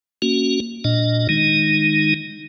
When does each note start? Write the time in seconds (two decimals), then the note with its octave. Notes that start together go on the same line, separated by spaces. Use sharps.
0.22 A#3 C#4 F#4
0.84 A#2 D4 D#5
1.29 D#3 G#3 D#4